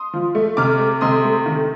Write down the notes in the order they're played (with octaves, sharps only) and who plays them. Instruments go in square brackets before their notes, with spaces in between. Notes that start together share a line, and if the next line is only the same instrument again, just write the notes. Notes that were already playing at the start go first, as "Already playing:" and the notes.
Already playing: [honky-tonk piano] C6 D#6
F3
A3
C3 D6 F6
A3
C3 C6 D#6
A3
D#3